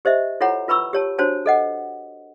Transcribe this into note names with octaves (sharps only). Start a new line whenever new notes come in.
G4 C5 D#5 E5
E4 F4 A4 C#5 F#5 A#5
F4 B4 A#5 B5 C#6 E6
G4 C#5 A5
D4 F#4 C5 C#5 A5
A4 D#5 F#5